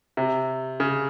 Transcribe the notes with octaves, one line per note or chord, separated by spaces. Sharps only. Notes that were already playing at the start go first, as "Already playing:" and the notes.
C3
C#3